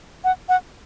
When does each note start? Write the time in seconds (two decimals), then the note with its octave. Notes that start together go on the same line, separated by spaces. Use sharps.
0.24 F#5
0.49 F#5